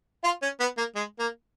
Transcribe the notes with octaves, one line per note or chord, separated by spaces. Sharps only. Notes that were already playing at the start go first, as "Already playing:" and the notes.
F4
C#4
B3
A#3
G#3
A#3